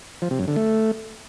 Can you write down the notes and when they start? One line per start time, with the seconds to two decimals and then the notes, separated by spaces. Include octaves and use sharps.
0.22 F3
0.31 C3
0.39 F#2
0.48 D3
0.56 A3